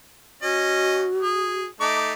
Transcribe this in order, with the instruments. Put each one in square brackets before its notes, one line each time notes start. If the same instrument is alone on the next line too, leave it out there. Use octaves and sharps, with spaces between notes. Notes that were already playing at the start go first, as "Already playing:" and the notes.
[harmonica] C#4 D#5 [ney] F#4
[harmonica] G#4
A3 D#4 D6